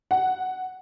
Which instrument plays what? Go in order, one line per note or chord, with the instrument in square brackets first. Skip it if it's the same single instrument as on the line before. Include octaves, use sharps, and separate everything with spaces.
[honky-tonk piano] F#5